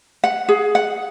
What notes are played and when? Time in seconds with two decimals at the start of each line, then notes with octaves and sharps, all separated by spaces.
0.24 F#5
0.49 G#4
0.75 F#5